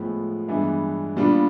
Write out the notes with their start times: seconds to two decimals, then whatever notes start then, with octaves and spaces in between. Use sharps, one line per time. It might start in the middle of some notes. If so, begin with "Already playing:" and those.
Already playing: A2 F3 G#3 B3
0.48 G2 E3 G#3 B3 D4
1.16 A#2 G3 B3 D4 F4